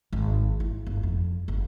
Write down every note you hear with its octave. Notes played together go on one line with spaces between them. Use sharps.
G#1
E4
G1
F2
G1